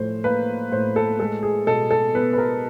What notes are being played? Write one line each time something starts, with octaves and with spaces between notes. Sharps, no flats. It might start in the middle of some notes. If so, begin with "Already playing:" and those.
Already playing: A2 F3 C5
A#3 B4
A2 C5
A4
G#3 A4
G#4
B2 A4
A4
B3 B4
B4
A#4